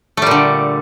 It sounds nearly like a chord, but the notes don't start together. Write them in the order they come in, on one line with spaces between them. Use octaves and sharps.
A3 G3 A#2 D3